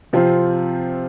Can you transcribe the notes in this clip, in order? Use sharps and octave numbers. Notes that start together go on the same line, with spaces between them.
C3 F3 C4 F4